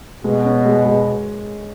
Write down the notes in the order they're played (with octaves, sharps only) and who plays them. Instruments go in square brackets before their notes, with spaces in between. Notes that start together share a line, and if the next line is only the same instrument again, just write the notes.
[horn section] B2 [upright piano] G#3
[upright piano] C#4
G#3
G#3